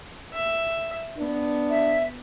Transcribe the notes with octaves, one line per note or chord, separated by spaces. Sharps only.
E5
B3 D4
E5